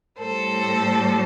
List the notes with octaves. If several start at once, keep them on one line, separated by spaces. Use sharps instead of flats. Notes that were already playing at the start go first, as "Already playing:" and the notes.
A2 G3 A4 C5